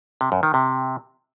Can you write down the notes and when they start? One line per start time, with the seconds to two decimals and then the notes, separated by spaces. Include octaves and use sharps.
0.21 C3
0.32 F#2
0.43 D#3
0.54 C3